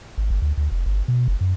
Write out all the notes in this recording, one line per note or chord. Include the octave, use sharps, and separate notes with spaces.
G#1
G1
D2
D2
F1
G1
B2
F#1
F#2